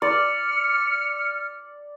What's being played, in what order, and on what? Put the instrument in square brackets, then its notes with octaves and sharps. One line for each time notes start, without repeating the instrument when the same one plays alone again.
[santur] D5 [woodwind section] F6 [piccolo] C#7